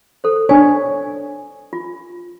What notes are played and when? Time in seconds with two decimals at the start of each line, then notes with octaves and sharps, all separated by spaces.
0.24 A4 C5
0.49 D4 C#5 G#5
1.73 F4